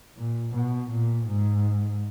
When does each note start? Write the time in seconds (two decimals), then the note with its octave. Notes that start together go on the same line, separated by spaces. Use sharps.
0.17 A#2
0.54 B2
0.91 A#2
1.27 G#2